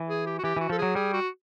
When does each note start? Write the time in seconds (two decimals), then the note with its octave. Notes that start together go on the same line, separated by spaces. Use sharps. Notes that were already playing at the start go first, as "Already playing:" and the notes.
Already playing: E3
0.09 G#4
0.26 G4
0.39 F#4
0.44 E3 G4
0.56 E3 F#4
0.70 F3 A4
0.78 F#3 G#4
0.95 G3 G#4
1.13 F#4